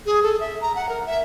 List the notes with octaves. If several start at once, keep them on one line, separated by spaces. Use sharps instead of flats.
G#4
A4
E5
A#5
F#5
A#4
E5